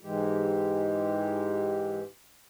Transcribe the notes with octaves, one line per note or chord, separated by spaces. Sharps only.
G#2 E3 G#3 G4